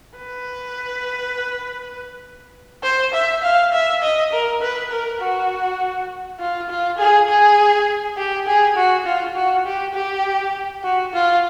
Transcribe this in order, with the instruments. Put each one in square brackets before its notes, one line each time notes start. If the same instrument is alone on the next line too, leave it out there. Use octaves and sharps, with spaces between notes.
[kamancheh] B4
C5
E5
F5
E5
D#5
A#4
B4
A#4
F#4
F4
F4
G#4
G#4
G4
G#4
F#4
F4
F#4
G4
G4
F#4
F4